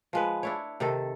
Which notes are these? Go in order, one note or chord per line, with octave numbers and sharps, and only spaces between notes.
F3 G#3 B4
D4 E4 C#5
C3 D#3 A4